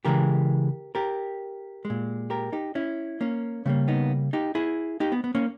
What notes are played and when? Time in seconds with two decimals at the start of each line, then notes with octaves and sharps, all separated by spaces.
0.05 C#3 E3 G#3 G4 A#4
0.95 G4 A#4
1.85 G#3
1.90 A#2
2.30 G4 A#4
2.53 D#4 G4
2.75 C#4 E4
3.21 A#3 C#4
3.66 C#3 G3 A#3 B3
3.88 B3 D#4
4.33 D#4 G4
4.55 E4 G#4
5.00 D#4 G4
5.12 B3
5.24 B3
5.35 A#3 C#4